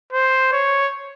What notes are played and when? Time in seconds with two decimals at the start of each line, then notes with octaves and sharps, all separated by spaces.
0.13 C5
0.52 C#5